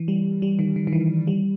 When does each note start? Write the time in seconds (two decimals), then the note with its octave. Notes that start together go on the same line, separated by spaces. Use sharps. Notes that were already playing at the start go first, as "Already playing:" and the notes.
Already playing: E3
0.08 G3
0.42 G3
0.59 D#3
0.76 D#3
0.87 D#3
0.93 E3
1.27 G3